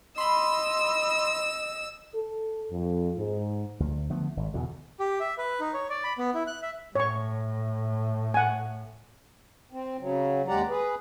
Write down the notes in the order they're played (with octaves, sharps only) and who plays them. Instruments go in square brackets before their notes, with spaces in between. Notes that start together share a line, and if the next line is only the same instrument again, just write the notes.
[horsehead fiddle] D#5 [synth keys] B5 C6 [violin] E6
[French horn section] A4
F2
G#2
[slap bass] D2
D3 F3 A3 B3
G#1
E2 B2 D3
[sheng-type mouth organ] G4
E5
B4
D#4
C#5
D5
B5
B3
E4
F#6
E5
[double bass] A2 [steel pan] C#5 C#6
[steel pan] F#5 G#5
[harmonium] C4
C#3 F#3
D#2 G#3 G4 D5 F#5 A#5
G#4 B4